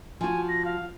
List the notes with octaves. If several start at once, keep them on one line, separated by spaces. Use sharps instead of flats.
F3 F#4 G#5
A#6
F5